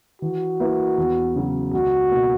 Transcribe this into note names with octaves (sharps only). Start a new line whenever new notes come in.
E3 F#4
A#3 E4 B4
E2
C#3 F#3
C#2 F#4
B2 A#3